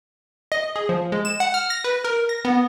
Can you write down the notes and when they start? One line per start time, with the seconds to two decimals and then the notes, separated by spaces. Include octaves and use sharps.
0.52 D#5
0.76 G#4
0.89 F3
1.12 G#3
1.25 E7
1.40 F#5
1.54 F6
1.70 A#6
1.84 B4
2.05 A#4
2.29 A#6
2.45 B3